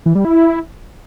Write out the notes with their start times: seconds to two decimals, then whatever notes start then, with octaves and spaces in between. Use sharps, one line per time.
0.06 E3
0.15 G3
0.25 E4